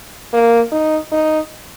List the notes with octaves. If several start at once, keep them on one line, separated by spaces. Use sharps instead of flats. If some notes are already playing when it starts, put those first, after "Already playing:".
A#3
D#4
D#4